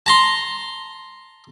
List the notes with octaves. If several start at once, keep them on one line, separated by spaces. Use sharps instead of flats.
A5 A#5 C6